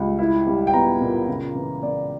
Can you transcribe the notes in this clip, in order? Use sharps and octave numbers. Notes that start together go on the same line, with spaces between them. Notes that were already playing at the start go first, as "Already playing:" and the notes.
Already playing: C#2 G3
E4
G3
G5
B3 A#5
A#2
C#3
E3
A#3 D5